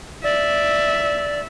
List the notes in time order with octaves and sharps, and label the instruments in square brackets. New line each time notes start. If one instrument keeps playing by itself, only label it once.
[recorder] D5 [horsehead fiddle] E5